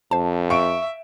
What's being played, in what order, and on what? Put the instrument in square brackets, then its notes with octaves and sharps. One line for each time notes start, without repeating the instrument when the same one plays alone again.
[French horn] F2 [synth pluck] C5 A5
[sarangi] E5 [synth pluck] F5 [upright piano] C#6 D7